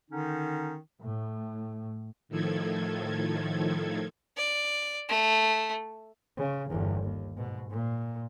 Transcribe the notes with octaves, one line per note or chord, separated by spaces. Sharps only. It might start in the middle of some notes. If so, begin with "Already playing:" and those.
D3 D#3 C#4 D#4
A2
A2 D#3 F3 A4 G#6
D5
A3
C#3
G1 E2
D#2
G#2 B2
A#2